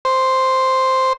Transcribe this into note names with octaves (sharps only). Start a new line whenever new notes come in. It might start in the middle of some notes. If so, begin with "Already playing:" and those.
C5